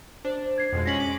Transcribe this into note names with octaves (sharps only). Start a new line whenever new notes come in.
D4 C5
G#6 C7
F2 B2 G#3
G#3 C#4 A#6 B6 F#7
D6